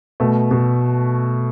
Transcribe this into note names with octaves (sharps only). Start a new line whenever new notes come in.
B2 A3
B2